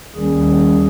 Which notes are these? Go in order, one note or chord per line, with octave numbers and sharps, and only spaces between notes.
D#2 D#3 G3 C#4 G#4